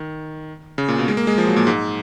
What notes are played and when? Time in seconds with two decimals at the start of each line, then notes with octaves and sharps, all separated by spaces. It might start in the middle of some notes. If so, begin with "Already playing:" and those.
Already playing: D#3
0.78 C#3
0.88 A#2
0.98 B2
1.08 G#3
1.17 A#3
1.27 G#3
1.38 F3
1.47 F#3
1.56 A#2
1.67 G#2